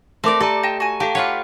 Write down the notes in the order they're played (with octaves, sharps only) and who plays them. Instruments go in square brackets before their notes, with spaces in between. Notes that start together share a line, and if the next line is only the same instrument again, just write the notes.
[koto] A3 D5 [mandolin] C4 A#4 D6
[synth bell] G4 A#5 [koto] A4 [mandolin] D5
[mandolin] D#5 G5 A5
F#4 G#5
[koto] G4 [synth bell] A4 F5 A5
[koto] F4 B4 C#5 [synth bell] F#5